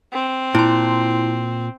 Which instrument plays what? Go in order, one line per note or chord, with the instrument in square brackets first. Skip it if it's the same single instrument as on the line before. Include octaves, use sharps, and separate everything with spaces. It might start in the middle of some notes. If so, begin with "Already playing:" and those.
[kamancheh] C4
[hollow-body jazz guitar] A#2 [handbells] E4 C6